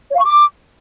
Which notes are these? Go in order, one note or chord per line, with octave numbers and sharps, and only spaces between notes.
C#5
F5
C#6
D6